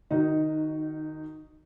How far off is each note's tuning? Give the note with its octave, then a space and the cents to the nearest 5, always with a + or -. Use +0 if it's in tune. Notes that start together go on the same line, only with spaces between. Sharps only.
D#3 -25 D#4 +0 F#4 +5